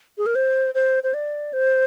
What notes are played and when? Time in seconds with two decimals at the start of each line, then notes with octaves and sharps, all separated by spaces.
0.18 G#4
0.26 A#4
0.35 C5
0.74 C5
1.03 C5
1.14 D5
1.53 C5